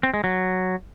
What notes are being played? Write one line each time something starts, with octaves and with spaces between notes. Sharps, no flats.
C4
G#3
F#3